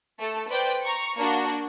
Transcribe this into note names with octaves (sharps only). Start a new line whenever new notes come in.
A3 A4
B4 C5 D5 G5
A#5 C#6 C#7
A#3 D4 F#4